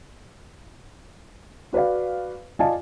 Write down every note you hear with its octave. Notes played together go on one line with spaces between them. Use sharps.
F#4 B4 D5 F5
F4 D5 D#5 F5 G#5 A5